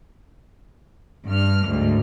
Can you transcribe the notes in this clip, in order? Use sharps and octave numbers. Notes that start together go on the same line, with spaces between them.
G2 F6
D2 G#2